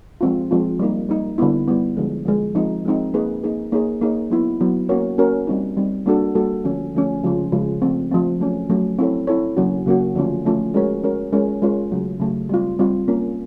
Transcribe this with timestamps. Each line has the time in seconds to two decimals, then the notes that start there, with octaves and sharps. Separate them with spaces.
0.21 F3 G#3 C4 F4
0.51 F3 G#3 C4 F4
0.79 G3 A#3 D#4
1.09 G3 A#3 D#4
1.38 D3 G3 B3 E4
1.68 D3 G3 B3 E4
1.97 D3 F3 G#3
2.26 D3 F3 G#3
2.55 F3 G#3 C4 D#4
2.85 F3 G#3 C4 D#4
3.14 A#3 D#4 G#4 B4
3.43 A#3 D#4 G#4 B4
3.72 A#3 D#4 G#4 C#5
4.01 A#3 D#4 G#4 C#5
4.30 F#3 B3 E4
4.60 F#3 B3 E4
4.89 A#3 C#4 F#4 A#4 C#5
5.18 A#3 C#4 F#4 A#4 C#5
5.47 G3 C4 D#4
5.77 G3 C4 D#4
6.06 G3 A#3 D4 F#4 A4
6.35 G3 A#3 D4 F#4 A4
6.64 D3 F3 A3 C#4
6.94 D3 F3 A3 C#4
7.24 C#3 F3 G#3 C#4 F4
7.52 C#3 F3 G#3 C#4 F4
7.82 F3 A3 C4
8.11 F3 A3 C4
8.40 F#3 A3 C#4
8.70 F#3 A3 C#4
8.99 C4 E4 A4 C#5
9.27 C4 E4 A4 C#5
9.57 C#3 F#3 A#3 C#4 F#4
9.86 C#3 F#3 A#3 C#4 F#4
10.16 D3 F3 A3 C#4 F4
10.44 D3 F3 A3 C#4 F4
10.74 G#3 C#4 F#4 A#4 C#5
11.03 G#3 C#4 F#4 A#4 C#5
11.33 G#3 C#4 F4 A#4 C#5
11.62 G#3 C#4 F4 A#4 C#5
11.91 C#3 F#3 A3
12.20 C#3 F#3 A3
12.49 G3 C4 F4
12.79 G3 C4 F4
13.08 A#3 C#4 F4